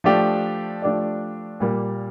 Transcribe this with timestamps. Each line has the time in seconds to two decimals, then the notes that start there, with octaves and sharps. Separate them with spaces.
0.04 F3 A3 D4 G4 D5
0.82 F3 A3 D4 G4 D5
1.60 A#2 G3 A#3